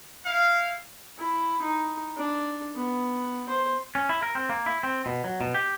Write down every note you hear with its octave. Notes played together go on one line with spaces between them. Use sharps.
E4 F5
E4
D#4
D4
B3
C5
C#4
E4
A#4
C4
A#3
E4
C4
B2
F#3
B2
G4